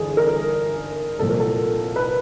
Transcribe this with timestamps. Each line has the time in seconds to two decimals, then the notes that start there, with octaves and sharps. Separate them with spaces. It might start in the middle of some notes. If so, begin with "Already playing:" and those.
Already playing: G1 E3 G#4
0.17 A#4
1.19 C2 A#2 F3 A4
1.29 A#4
1.40 A4
1.96 B4